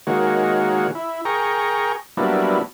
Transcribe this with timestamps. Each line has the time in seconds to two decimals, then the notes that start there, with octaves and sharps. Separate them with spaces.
0.07 D#3 G#3 A#3 F#4 C#5
0.95 E4
1.25 G#4 A#4 G5 A#5 C#6
2.17 F#3 G3 A#3 B3 D4 E4